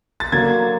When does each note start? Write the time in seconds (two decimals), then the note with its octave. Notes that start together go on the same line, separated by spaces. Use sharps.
0.20 A6
0.32 D3 F#3 A#3 G#6